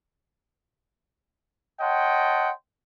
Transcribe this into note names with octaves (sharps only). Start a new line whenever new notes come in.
C#5 D#5 F#5 G5 A5 C6